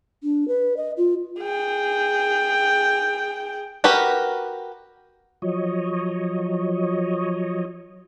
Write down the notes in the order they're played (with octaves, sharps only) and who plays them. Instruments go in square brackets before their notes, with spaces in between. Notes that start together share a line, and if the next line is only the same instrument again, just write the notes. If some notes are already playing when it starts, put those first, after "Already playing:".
[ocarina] D4
B4
D#5
F4
[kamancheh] G#4 G5
[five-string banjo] F#4 G4 A#4 B4
[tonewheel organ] F3 F#3 C#5 D#5